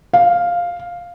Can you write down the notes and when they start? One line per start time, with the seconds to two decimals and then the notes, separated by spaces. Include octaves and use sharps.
0.13 F5